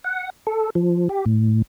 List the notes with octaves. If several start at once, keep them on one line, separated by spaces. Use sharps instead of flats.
F#5
A4
F3
G4
A2